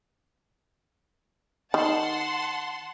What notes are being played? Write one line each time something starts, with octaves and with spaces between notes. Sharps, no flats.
D#3 F#5 A5 C6